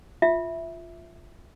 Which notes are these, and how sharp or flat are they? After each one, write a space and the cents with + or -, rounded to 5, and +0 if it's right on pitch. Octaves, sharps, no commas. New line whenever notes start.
F4 +0 E5 +0